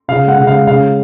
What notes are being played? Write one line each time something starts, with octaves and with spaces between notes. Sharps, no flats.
C#3 F5
G#3
F#5
C#3
F5
G#3
C#3 F5